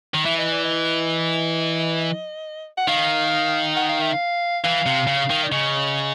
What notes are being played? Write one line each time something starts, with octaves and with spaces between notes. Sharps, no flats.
D#3
E3 E5
D#5
D5
D#5
F#5
D#3 F5
F#5
F5
E5
F5
E3 F5
C3
C#3
D#3
D5
C#3 D#5